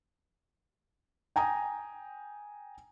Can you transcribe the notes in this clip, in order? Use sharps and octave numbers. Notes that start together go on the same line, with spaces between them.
G5 G#5 A#5 D#6